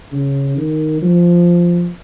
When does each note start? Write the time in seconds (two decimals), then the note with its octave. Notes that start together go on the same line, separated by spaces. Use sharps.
0.12 C#3
0.57 D#3
1.02 F3